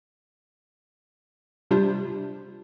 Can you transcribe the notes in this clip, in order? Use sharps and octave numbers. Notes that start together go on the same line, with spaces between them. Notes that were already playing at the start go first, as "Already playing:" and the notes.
C3 G3 D4 F4 G4 C5